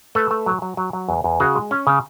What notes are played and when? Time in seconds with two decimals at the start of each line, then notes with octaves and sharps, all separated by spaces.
0.15 A3 A4 B4
0.31 A3
0.46 F#3
0.62 F#3
0.77 F#3
0.93 F#3
1.09 E2
1.24 E2
1.40 C#3 F#4 G#4
1.55 G#3
1.71 C#4
1.87 C#3